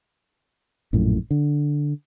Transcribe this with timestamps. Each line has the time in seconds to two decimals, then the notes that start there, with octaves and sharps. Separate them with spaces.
0.93 A#1 F#2 A2
1.31 D3